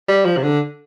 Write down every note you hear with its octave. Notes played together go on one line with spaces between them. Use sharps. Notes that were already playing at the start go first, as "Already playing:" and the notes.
G3
F3
C3
D3